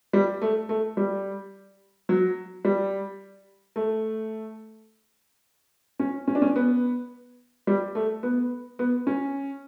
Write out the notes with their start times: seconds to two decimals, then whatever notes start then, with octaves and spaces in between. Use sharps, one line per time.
0.13 G3
0.42 A3
0.69 A3
0.97 G3
2.09 F#3
2.65 G3
3.76 A3
5.99 C#4
6.27 C#4
6.35 D4
6.42 C#4
6.56 B3
7.67 G3
7.95 A3
8.23 B3
8.79 B3
9.07 C#4